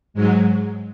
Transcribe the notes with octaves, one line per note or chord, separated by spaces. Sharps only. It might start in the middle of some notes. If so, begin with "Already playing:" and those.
G#2 F#3 G#3